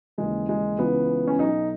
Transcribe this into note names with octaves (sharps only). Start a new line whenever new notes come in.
D#2 C#3 E3 G#3
G#3
C#2 C#3 E3 B3
C#4
B1 B2 D#4